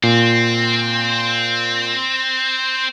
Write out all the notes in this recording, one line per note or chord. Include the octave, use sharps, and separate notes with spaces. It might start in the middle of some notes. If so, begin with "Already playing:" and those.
A#2 C4